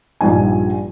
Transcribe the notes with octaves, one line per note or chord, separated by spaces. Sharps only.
A#1 G2 D#4 G#5